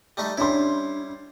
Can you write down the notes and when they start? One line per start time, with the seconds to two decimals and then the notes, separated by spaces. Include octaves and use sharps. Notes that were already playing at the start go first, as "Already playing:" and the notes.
0.17 G3 A3 D#4
0.38 G3 C#4 D4 E4 C6